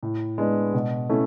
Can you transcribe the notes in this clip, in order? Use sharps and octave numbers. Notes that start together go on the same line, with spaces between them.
A2
G#3 B3 D4
B2
A3 C#4 E4